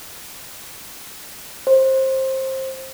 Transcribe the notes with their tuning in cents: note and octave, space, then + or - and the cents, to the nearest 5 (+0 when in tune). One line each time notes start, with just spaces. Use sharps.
C5 +20